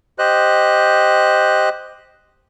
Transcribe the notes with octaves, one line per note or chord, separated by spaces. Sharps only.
G4 C5 D#5 F#6